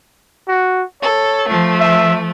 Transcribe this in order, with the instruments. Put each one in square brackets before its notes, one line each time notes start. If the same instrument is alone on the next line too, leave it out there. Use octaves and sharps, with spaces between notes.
[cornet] F#4
[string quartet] A4 [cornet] C#5
[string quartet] F3 A3
[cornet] E5